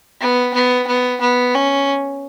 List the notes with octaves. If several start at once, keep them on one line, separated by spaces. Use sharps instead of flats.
B3
B3
B3
B3
C#4